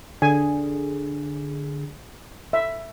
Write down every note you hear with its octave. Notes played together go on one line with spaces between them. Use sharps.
D3 G#4 G#5
E5